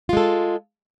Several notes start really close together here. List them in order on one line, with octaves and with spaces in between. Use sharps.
F4 G#3 A4